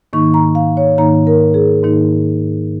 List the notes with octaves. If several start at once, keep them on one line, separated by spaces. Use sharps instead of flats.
G#2 D#3 A#3 D#4 C#6
A#5
F5
C#5
G#2 D#3 A#3 D#4 A#5
A#4
G#4
G#2 D#3 A#3 D#4